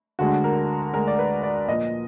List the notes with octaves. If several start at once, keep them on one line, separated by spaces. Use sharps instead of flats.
D2 D3 G#3 D4 F#4
A#4
D2 D3 G#3 D4 A#4
D5
B4
D5
A#2 F3 A#3 D#5